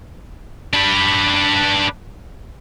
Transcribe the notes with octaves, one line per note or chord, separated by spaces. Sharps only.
D4 B4